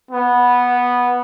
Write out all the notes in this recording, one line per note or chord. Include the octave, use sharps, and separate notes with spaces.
B3